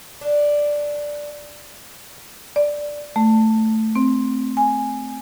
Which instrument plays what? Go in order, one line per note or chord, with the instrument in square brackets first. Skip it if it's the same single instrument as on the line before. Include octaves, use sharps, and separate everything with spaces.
[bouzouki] D4
[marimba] D5
A3
C4
G#5